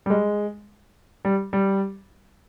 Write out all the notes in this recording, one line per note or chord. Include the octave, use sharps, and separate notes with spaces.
G3
G#3
G3
G3